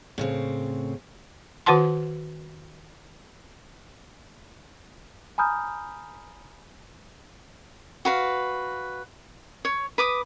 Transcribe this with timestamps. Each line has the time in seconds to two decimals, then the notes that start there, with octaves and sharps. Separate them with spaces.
0.18 A2 C#3 C4
1.66 D#3 F#4 B4 F#5 A5 C6
5.38 G#5 A#5 B5 D#6 F6 G6
8.05 F#4 B4 F5
9.65 C#5
9.98 B4 D6 D#6